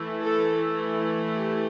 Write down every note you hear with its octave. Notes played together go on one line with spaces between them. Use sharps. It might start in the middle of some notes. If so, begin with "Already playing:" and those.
Already playing: E3 A3 E4
A4
G4